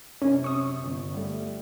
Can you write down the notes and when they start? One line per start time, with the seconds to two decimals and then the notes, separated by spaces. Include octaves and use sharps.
0.22 F#2 C3 C#4
0.44 C#6 D#6
0.83 G1
1.14 G3 A3